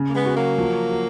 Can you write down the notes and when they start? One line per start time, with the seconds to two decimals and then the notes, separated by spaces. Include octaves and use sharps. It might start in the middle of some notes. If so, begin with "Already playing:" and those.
Already playing: C#3
0.09 A#3
0.15 G#3 B3
0.25 F#4
0.36 F#3 A#3
0.58 F3
0.90 F#4